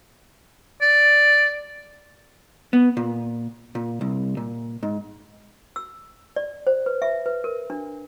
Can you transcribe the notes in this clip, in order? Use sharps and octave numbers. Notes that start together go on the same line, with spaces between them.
D5
B3
A#2
A#2
C2
A#2
G#2
E6
D5
C5
B4
E5
B4
A#4
D4